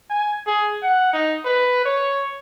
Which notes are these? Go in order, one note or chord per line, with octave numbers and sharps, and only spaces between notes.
G#5
G#4
F#5
D#4
B4
C#5